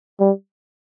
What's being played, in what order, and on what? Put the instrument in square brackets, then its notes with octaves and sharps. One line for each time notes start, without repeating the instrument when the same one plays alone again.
[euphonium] G3